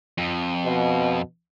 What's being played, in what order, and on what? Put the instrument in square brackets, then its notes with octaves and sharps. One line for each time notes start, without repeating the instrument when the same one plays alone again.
[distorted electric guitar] F2
[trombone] B2